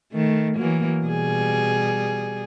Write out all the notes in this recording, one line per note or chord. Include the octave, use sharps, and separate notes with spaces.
D#3 A3
E3 F#3 A#3
B2 G3 G#4